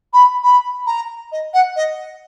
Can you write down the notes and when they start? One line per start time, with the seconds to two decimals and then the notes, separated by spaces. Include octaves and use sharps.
0.13 B5
0.43 B5
0.87 A#5
1.32 D#5
1.54 F#5
1.76 D#5